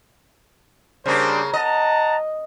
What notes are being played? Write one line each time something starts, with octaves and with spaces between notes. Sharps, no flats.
C#3 G3 A#3 D4 C5
D#5 F#5 A5 A#5